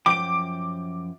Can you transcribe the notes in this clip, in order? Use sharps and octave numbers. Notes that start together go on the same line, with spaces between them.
F#2 F3 G5 D6 D7